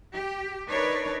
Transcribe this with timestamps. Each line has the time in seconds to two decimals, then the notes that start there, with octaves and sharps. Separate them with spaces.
0.13 G4
0.68 D4 D#4 A#4 B4 C#5 D5